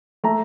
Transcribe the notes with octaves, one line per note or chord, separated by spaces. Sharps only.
A3 A#5